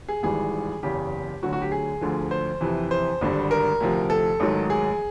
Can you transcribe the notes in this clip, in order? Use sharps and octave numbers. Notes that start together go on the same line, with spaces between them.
G#4
G#1 G#2 E3 G3 G#4
F#1 E2 C#3 G4
D2 D3 F#3 F#4
F#4
G4
G#4
D2 D3 F3
C5
F2 C3 E3
C5
G#1 G2 D3 G3
A#4
D2 C3 F3
A4
A1 G#2 D#3 F#3
G#4